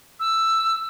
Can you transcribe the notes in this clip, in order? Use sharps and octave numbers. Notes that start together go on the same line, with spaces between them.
E6